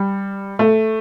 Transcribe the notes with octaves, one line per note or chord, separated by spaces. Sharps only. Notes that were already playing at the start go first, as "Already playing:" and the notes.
Already playing: G3
A3